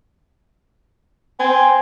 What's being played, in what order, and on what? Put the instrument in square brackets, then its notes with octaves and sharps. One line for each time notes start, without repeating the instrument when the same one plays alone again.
[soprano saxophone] C4 [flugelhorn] G#5